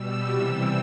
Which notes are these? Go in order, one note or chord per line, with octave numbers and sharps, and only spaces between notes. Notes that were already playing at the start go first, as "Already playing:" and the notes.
Already playing: B2 G3 E6
C3 E3 G3